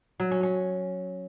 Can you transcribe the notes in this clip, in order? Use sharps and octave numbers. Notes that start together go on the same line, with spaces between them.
F#3
C#4
C#4